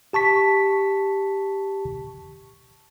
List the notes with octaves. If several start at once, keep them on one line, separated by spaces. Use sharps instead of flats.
G4 A5 C#6 B6